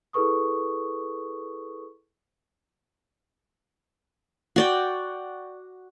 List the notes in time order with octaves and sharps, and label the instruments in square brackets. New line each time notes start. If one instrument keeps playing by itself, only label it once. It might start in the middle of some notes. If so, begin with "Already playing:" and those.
[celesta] E4 G#4 A4 B4 C#6 D#6
[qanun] F#4 D5 G5